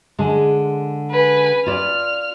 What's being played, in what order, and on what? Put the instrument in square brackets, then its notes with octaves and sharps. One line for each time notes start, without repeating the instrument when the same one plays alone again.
[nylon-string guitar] D3 G#3
[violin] B4 G#5
[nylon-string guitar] F4 D5 [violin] F6